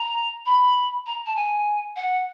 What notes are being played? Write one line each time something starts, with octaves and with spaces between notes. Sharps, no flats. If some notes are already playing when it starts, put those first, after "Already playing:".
Already playing: A#5
B5
A#5
A5
G#5
F#5